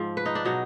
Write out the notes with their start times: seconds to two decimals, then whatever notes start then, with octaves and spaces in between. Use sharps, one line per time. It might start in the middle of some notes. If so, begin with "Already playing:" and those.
Already playing: G#2 F3
0.17 B4
0.26 D#4
0.35 D4
0.45 B2 F#3 D#4